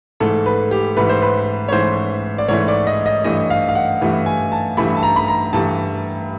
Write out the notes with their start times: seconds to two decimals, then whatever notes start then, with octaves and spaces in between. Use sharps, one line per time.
0.20 G#2 E3 A3 A4
0.46 B4
0.71 G4
0.97 G#2 E3 A3 B4
1.09 C5
1.22 B4
1.69 C#5
1.72 G#2 E3 A3 C5
2.38 D5
2.48 G#2 E3 A3 C#5
2.68 D5
2.87 D#5
3.06 D#5
3.24 G2 E3 A3 D#5
3.50 F5
3.69 F5
3.75 F#5
4.01 G2 E3 A3
4.26 G#5
4.52 A5
4.77 G2 E3 A3 B5
4.97 A5
5.03 A#5
5.16 B5
5.28 A#5
5.53 G2 E3 A3 A5